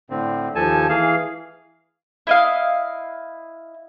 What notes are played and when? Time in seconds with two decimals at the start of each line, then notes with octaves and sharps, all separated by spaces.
0.10 A2 D3 C4
0.55 D#2 F3 A4 G#5 A5
0.89 E3 G#4 F5
2.27 E4 D#5 F5